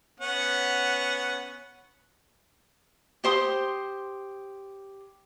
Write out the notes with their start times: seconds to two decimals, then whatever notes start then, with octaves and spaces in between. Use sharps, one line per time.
0.20 B3 C#4 F#5
3.24 G4 C5 C6 D#6